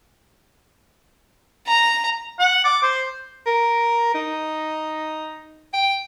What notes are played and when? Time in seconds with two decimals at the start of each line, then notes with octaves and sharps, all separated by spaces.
1.67 A#5
2.39 F#5
2.64 D6
2.83 C5
3.46 A#4
4.14 D#4
5.73 G5